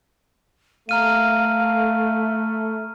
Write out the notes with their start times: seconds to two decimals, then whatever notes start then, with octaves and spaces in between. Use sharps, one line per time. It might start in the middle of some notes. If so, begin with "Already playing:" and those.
0.89 A3 F5 A#5 F6 D#7